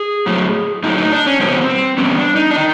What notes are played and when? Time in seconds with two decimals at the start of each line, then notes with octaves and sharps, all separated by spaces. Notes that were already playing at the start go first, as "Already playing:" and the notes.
Already playing: G#4
0.26 A2 F#3 A3
0.83 A2 F#3 A3 D#4
0.98 D#4
1.12 D4
1.26 C#4
1.40 E2 B2 G3 B3 C4
1.98 E2 B2 G3 B3 C#4
2.17 D4
2.36 D#4
2.50 D4
2.56 D#3 D#4